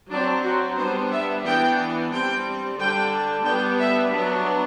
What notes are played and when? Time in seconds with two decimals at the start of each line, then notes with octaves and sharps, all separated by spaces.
0.11 F#3 C4 D4
0.44 F#4
0.77 G3 B3 D4 C5
1.11 E5
1.45 E3 B3 D4 G5
2.12 G3 C4 G5
2.79 D3 G3 D4 G5
3.46 G3 B3 D4 G5
3.80 E5
4.12 F#3 B3 D4